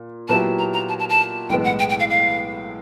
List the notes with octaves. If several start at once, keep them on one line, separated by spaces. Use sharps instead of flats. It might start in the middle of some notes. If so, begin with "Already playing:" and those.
Already playing: A#2
A#2 F#3 B3 E4 G4 A5
A#5
A#5
A5
A5
A5
B1 A2 E3 G#3 B3 G5
F#5
G5
G5
F5
F5